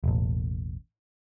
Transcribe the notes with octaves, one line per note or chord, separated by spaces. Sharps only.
E1 A1